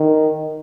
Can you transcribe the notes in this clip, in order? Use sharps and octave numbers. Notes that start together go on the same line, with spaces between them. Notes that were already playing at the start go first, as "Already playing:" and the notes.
Already playing: D#3